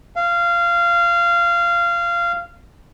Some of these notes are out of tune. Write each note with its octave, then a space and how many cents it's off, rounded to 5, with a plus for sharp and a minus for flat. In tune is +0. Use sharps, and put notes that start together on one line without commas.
F5 -20